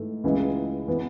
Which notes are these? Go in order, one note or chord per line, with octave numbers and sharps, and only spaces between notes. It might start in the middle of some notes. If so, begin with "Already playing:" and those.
Already playing: G#2 E3 A3
C#2 C#3 E3 G#3
E3 B3